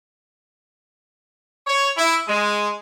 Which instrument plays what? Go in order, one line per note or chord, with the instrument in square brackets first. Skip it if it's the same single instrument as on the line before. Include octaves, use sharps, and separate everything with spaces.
[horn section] C#5
E4
G#3